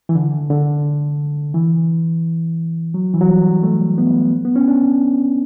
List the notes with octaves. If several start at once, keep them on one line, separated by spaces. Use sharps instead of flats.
E3
D3
D3
E3
F#3
E3
F#3
G3
A3
B3
B3
C#4
D4